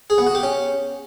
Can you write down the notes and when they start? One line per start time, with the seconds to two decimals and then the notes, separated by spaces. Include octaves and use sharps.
0.10 G#4
0.18 B3
0.27 F#4
0.35 G4
0.43 C#4